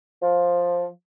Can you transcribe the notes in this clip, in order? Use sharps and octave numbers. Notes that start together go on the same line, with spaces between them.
F3